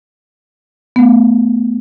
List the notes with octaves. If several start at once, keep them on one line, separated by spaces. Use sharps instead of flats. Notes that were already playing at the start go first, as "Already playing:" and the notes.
A3 B3